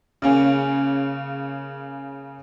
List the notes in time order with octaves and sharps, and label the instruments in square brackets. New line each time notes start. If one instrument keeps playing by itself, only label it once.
[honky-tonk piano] C#3 A#3 C#4